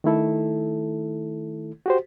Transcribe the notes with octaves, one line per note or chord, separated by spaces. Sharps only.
D#3 A3 E4 A4
F#4 G4 C5